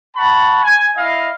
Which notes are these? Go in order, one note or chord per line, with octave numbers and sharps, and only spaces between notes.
F#5 A5 B5 C#6
G#5
E4 D#5 F5